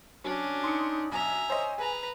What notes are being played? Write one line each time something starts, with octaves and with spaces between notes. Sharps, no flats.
F#3 C#4 D4
D#4 C6 D#6 C#7
B1 E5 G#5 A#5
C5 C#5 D#5
G#4 B4 A#5